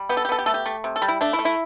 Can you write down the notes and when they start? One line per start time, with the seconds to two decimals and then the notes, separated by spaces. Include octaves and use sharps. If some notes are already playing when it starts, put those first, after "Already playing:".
Already playing: G3
0.09 B3 G4
0.17 A4
0.25 G4
0.29 B3 A4
0.39 G4
0.46 A3 A4
0.54 G4
0.66 A3
0.84 C3
0.96 A4
1.02 G3
1.08 E4
1.21 A3 D4
1.33 E4
1.39 A3
1.45 E4